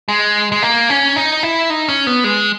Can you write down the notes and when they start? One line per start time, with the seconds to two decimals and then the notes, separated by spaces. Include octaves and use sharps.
0.09 G#3
0.52 G#3
0.63 A#3
0.90 C#4
1.16 D#4
1.43 E4
1.70 D#4
1.88 C#4
2.07 B3
2.24 G#3